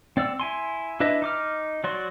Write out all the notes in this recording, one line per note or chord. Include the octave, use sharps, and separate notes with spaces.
C4 D5 F#5 E6
E4 G#5 C6
D4 E4 B4 D#5 E5
D#4 D6 F6
F#3 F#4 D5 C6